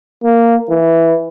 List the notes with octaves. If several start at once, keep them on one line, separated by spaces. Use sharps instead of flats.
A#3
E3